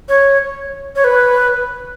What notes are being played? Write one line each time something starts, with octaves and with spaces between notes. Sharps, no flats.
C#5
C#5
B4